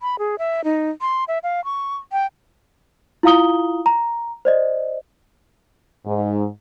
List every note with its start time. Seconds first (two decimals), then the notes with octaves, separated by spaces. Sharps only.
0.01 B5
0.19 G#4
0.39 E5
0.64 D#4
1.01 C6
1.28 E5
1.43 F5
1.65 C#6
2.12 G5
3.23 E4 F4 F5 A#5 D#6 G7
3.86 A#5
4.45 C5 D5 D#5
6.05 G#2